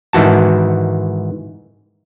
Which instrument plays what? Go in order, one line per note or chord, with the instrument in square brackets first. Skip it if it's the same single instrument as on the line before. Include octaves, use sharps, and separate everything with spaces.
[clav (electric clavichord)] G#2 D#3 E3 F#4 A5